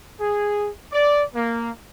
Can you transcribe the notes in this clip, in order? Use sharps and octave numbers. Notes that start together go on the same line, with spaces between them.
G#4
D5
A#3